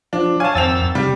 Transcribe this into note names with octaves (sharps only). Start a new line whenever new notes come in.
F3 D4
C#5 F5 G#5 A5
G#1 F2 C4 E6 A6 F7
C3 G3